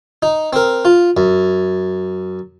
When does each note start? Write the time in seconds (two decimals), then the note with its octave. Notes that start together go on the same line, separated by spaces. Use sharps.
0.23 D#4
0.53 C4 A#4
0.85 F4
1.17 F#2